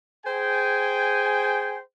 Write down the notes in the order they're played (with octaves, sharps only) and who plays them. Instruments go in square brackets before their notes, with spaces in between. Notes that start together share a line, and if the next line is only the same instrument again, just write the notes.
[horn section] G#4 C5 G5 G#5